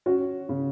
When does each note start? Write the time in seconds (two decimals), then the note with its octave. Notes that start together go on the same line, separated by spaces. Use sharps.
0.06 C#4 F#4
0.49 C#3